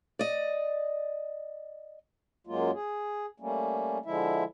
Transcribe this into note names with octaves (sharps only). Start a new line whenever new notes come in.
D5 D#5
F#2 F#3 G#3 A#3 F4
G#4
G3 A3 A#3 C#4
D3 F3 G#3 E4 E5